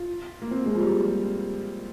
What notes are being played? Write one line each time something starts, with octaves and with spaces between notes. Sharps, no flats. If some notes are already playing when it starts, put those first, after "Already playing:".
Already playing: F4
A#3
C4
G#3
F3
G3